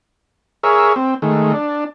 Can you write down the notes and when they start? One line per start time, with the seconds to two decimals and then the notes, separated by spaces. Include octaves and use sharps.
0.63 G#4 A#4 C#5 E5
0.96 C4
1.22 D#3 G#3 A3
1.53 D4